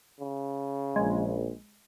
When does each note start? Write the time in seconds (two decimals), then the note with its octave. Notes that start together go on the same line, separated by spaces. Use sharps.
0.20 C#3
0.96 A#1 G#3